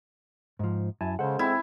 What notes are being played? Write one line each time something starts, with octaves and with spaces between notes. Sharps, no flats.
G#2 F3
F#2 E4 G#5 A5
C#3 G#3 A4 C5 F#5
C4 E4